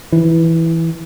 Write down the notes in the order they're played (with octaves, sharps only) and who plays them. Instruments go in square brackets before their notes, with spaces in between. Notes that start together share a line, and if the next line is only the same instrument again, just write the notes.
[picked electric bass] E3